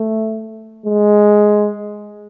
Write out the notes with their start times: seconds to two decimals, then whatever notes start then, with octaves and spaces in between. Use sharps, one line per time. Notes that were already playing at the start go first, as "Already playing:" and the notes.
Already playing: A3
0.86 G#3